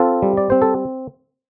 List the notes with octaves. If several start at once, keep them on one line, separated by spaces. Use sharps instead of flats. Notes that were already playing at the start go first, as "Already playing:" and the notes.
Already playing: C4 F4 A4
G3
D5
C4 C5
A4